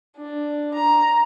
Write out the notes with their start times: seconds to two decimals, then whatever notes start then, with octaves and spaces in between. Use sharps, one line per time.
0.17 D4
0.74 A#5